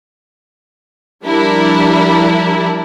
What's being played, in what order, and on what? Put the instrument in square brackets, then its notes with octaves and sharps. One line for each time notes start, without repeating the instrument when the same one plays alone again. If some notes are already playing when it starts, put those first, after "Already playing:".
[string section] F3 G3 D4 E4 A#4